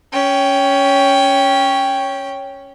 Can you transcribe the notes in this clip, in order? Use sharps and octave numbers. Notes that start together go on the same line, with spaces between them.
C#4 G5